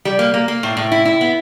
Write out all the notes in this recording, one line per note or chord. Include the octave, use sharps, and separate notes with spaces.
G3
A#3
A#3
A#3
A2
A2
E4
E4
B3